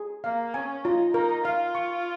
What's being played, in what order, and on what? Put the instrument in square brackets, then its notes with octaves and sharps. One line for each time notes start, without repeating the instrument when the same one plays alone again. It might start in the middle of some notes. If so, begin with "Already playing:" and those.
Already playing: [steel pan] G#4
[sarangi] A#3 [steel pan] F5
[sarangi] C#4 [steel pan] G#5
[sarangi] D#4 [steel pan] F4
[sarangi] D#4 [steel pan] A#4
[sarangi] F4 [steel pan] F5
[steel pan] C#6